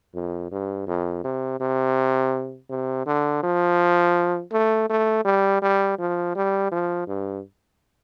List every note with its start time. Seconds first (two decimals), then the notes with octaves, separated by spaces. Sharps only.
0.15 F2
0.51 G2
0.87 F2
1.24 C3
1.60 C3
2.69 C3
3.06 D3
3.43 F3
4.52 A3
4.89 A3
5.25 G3
5.62 G3
5.98 F3
6.35 G3
6.72 F3
7.07 G2